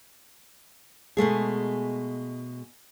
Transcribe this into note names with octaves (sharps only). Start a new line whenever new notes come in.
B2 G#3 A3 G#4